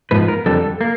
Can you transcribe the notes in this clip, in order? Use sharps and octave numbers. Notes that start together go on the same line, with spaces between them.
G#2 F3 B3 B4
A#4
F2 D3 G3 A4
A#3